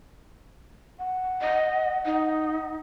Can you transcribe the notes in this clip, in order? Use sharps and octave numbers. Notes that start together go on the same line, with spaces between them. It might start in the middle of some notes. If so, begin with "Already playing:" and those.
F#5
D#5
D#4